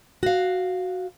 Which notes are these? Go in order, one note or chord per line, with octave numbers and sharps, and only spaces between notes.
F#4 F5